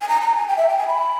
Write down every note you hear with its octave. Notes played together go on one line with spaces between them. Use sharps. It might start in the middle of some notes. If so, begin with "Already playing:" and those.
G#5
A#5
A#5
G#5
G5
E5
G5
G#5
B5